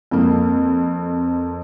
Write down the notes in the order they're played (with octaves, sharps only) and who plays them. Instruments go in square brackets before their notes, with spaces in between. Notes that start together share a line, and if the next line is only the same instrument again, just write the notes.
[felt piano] F2 A#3